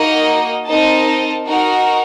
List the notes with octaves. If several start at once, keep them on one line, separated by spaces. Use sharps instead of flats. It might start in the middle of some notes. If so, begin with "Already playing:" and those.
Already playing: A#3 D#4 F#4 A#4 D#5
C4 D#4 A#4 D#5 A5
D#4 F#4 A#4